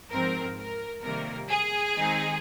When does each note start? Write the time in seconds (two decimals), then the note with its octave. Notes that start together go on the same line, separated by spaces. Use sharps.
0.11 G#2 F3 C4 A#4
0.57 A#4
1.03 F2 C3 D#3 G3 A#3 A#4
1.49 G#4
1.95 D#3 G#3 C4 D#4